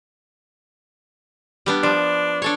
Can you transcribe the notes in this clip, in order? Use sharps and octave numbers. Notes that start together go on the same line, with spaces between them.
G3 B3 D4
F3 D4
D4 A4 C#5